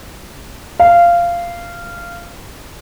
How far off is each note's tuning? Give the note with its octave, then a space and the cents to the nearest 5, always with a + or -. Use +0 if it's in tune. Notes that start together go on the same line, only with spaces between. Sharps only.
F5 -15